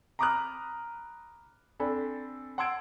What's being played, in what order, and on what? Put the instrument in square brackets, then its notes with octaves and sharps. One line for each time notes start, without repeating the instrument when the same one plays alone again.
[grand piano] A#5 B5 D6 D#6 F6 F#6
C4 D4 A4 G#5 B5
F#5 A5 C6 E6 G#6 D7